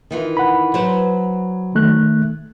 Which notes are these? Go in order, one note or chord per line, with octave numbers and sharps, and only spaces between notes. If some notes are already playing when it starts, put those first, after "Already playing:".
D#3 E3 F4
F#5 B5
F#3 B4 C5
D#3 A3 F#6